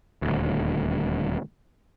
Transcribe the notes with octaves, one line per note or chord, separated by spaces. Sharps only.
D#1 D2